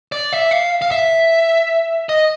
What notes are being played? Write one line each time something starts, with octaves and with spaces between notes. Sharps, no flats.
D5
E5
F5
F5
E5
D#5